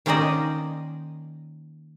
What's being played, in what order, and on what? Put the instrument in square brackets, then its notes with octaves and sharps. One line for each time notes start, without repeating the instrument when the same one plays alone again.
[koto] D#3 A#3 C#4 C5 D5 D#5